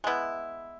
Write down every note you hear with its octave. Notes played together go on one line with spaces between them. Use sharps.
G#3 B3 E4